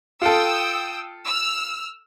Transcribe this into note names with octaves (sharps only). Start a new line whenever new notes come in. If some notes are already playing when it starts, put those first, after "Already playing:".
F4 A4 G5 D#6 E6
E6 F6